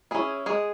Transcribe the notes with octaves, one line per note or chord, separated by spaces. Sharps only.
C#4 E4 G#4
G#3 G#4